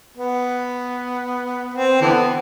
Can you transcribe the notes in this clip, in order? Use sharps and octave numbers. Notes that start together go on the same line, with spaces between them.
B3
C4
D3 E3 B3